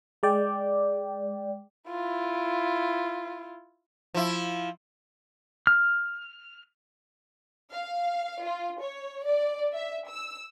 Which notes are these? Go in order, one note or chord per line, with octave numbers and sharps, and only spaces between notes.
G#3 D5 G5
E4 F4
F3 E4
F6
F5
F4
C#5
D5
E5
E6